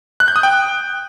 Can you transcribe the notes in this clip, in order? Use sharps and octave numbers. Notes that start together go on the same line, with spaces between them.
F#6
G6
D#6
G5